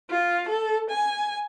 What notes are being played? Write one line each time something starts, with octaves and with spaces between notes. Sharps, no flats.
F4
A4
G#5